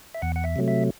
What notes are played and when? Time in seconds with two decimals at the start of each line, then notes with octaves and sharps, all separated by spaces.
0.14 E5
0.22 E2 F#5
0.36 F#5
0.44 E5
0.56 C3 F#3 A3
0.68 E5